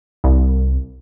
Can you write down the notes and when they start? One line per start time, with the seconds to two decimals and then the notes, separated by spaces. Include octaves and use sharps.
0.24 C2